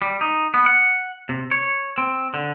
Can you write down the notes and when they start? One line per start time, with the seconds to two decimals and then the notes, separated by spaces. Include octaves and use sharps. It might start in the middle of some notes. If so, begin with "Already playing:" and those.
0.02 G3
0.21 D#4
0.54 B3
0.66 F#5
1.29 C3
1.51 C#5
1.98 C4
2.34 D3